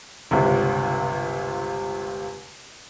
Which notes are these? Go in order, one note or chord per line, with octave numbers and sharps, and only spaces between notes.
G1 C#2 C3